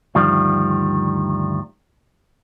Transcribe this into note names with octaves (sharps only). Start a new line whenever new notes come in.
D2 G2 D#3 F3 G3